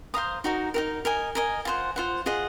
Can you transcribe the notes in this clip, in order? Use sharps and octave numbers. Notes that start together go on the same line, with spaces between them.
C5 F5 A#5 D#6
D#4 F#4 A#4
D#4 F#4 A#4
A#4 D#5 G#5
A#4 D#5 G#5
F4 C5 F#5
F4 C5 F#5
F4 G#4 D#5 F#5